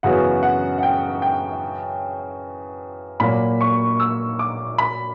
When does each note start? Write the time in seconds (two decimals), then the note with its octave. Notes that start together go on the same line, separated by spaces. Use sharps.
0.03 F#2 C#3 E3 B3 F#4 F#5
0.43 F#5
0.78 F#5
0.83 G5
1.22 G5
3.20 A#2 F#3 A#3 B5
3.61 C#6
4.00 E6
4.39 D6
4.78 B5